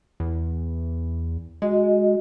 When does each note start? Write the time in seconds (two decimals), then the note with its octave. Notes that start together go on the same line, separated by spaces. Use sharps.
0.20 E2
1.62 G#3 F#4 D#5